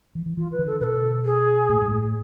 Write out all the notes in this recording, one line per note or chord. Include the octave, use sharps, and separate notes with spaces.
E3
E3
E3 F4
B4
D3
A4
B2 A4 B4
G#4
A2
G#2
A2